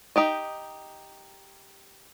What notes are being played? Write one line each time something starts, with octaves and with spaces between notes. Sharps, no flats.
D#4 G4 D#5